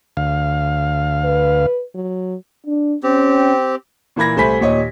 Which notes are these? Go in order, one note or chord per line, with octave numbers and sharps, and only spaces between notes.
D2 F5
B4
F#3
D4
C4 C#4 G4
A#2 E3 A#3 B5 G#6 A#6
C2 A3 C5 G#5 B5 B6
D#2 A#2 C#5 D#5